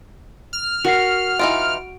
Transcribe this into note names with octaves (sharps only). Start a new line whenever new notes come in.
F6
F#4 A#4 F#5 C7
E3 D#4 F4 D7